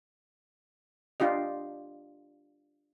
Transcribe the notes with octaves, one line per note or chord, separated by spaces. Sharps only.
D4 F4 G4 D#5